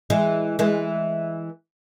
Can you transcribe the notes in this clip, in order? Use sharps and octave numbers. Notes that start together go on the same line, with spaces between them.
E3 G#3
E3 G#3